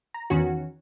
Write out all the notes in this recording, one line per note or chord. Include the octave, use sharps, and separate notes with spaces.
A#5
E2 D#3 C#4 F#4